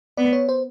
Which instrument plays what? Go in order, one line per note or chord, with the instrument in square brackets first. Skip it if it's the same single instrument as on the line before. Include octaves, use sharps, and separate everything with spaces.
[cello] B3 [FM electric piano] D5
[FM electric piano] C#5
C5